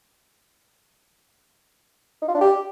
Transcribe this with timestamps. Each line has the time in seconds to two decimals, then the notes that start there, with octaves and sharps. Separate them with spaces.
2.22 D#4
2.28 F4
2.35 D4
2.41 G4